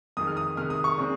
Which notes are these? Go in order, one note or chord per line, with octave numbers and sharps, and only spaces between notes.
F2 D#3 G#3 D#4 D#6
F6
D#6
C3 D#3 G#3 F6
D#6
C#6
A#2 G#3 C4